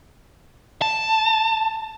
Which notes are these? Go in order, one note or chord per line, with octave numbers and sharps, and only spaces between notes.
A5